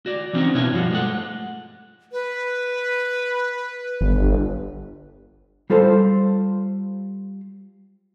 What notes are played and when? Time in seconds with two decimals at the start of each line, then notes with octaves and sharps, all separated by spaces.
0.06 F#4 D5
0.33 E3 G3 C4 C#4 D#4 F#4
0.54 B2 D#4 E4 B4 C#5 E5
0.72 G2 F3 G3 F#4
0.91 G#3 A3 F#5
2.12 B4
4.01 G1
5.70 G3 F4 A4 C5